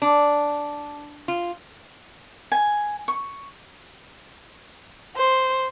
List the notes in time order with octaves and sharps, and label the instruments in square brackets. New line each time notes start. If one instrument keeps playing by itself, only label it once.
[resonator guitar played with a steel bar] D4
F4
[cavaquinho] G#5
C#6
[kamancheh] C5